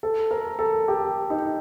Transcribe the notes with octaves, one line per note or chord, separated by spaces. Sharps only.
A4
A#4
A4
G4
D#4